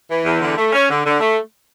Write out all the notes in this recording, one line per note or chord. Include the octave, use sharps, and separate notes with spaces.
E3
E2
D3
A3
C#4
D3
D3
A3